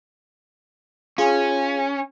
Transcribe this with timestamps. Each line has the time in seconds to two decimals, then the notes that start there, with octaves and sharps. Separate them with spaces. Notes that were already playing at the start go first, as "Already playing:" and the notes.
1.18 C#4 F4 G#4